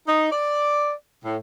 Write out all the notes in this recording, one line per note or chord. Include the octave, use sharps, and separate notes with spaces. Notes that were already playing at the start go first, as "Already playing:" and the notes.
D#4
D5
A2